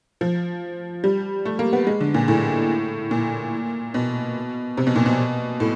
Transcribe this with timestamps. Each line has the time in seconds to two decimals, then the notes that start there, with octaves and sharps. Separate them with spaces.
0.21 F3
1.04 G3
1.45 A3
1.59 A#3
1.73 B3
1.87 G#3
2.00 D3
2.14 A#2
2.28 A2
3.11 A#2
3.94 B2
4.77 C3
4.87 B2
4.96 A#2
5.06 B2
5.60 A2